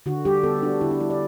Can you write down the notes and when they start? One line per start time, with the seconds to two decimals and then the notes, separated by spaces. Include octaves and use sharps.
0.06 D3 F#4
0.25 G3 G4
0.44 B3 A4
0.62 D4 F#4
0.81 D3 E4
0.91 D4
1.00 G3 E4
1.10 D5